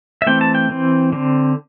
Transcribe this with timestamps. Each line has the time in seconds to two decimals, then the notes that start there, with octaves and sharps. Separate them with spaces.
0.22 E5
0.26 E3 A3 C4 G5
0.41 A5
0.55 G5
0.70 E3 C4
1.13 D3 C4